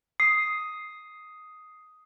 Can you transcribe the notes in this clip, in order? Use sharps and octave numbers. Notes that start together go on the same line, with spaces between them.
D#6 C7